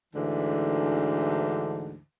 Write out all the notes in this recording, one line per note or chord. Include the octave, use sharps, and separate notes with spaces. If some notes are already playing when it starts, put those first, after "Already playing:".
D2 G#2 D3 E3